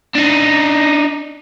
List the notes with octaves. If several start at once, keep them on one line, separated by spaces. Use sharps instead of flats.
D4 D#4